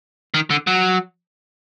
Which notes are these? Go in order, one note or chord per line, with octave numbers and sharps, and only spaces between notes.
D#3
D3
F#3